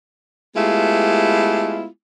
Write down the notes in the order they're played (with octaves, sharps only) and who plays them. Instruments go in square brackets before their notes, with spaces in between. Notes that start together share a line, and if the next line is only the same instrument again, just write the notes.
[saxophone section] G#3 A3 B3 E4 F4 G4